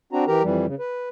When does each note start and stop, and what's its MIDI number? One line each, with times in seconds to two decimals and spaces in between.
0.13 0.25 60
0.13 0.25 62
0.13 0.25 66
0.13 0.25 82
0.28 0.43 52
0.28 0.43 67
0.28 0.43 70
0.28 0.43 82
0.43 0.66 41
0.43 0.66 52
0.43 0.66 55
0.66 0.75 49
0.79 1.09 71